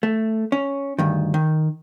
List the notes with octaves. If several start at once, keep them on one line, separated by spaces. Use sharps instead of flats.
A3
C#4
D2 G2 D#3
D#3